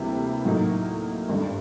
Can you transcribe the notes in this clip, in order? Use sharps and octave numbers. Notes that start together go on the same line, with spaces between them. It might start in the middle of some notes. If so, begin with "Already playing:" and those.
Already playing: D2 C3 E3 G3 A#3
A2 F#3 A#3 D#4
G#1 G2 D3